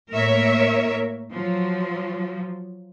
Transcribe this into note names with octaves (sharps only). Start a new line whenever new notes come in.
A2 A#3 A#4 C#5 E5
F3 F#3